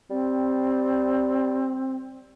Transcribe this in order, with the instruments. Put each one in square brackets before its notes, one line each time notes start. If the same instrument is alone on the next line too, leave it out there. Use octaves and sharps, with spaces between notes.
[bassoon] G3 [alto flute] C4